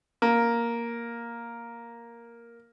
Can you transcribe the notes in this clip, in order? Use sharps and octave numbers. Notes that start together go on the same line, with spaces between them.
A#3